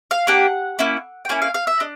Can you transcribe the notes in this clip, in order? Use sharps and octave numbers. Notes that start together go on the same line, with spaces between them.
F5
A#3 D4 G4 F#5
A#3 C#4 E4
G5
A#3 C#4 E4 G#5
F5
F5
E5
D4 D#5